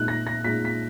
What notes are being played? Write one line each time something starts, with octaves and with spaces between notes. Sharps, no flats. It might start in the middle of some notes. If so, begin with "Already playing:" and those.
Already playing: A#2 G#3 D#4 F#6
A#6
A#6
A#2 G#3 D#4 B6
B6